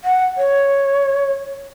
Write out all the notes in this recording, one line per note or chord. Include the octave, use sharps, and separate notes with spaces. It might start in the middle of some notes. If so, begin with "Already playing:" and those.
F#5
C#5